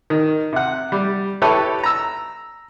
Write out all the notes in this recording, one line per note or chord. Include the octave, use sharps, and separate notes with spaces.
D#3
C3 F#5
G3
E4 G4 A4 B4 C#5
A#5 E6